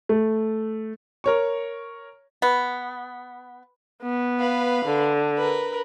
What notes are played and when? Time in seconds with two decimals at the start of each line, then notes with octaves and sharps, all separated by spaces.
0.09 A3
1.24 A#4 C#5 C#6
2.42 B3
4.03 B3
4.39 B4 F5
4.85 D3
5.38 A#4 B4